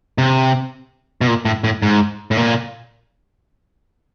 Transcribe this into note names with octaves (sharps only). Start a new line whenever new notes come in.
C3
B2
A#2
A2
A2
G#2
A2
A#2